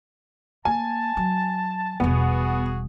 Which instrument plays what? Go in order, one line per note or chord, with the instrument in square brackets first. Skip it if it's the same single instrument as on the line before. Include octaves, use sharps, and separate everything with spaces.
[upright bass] A#3 [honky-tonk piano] G#5 [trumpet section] A5
[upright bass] F#3
[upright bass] E1 G3 [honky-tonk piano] B3 [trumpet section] F#4 G#4